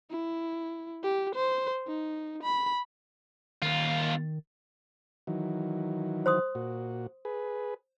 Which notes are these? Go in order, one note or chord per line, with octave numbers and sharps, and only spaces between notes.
E4
G4
C5
D#4
B5
D#2 D#3 F4
D#3 E3 F#3
C5 C6 D#6
A#2 F#4
G#4 B4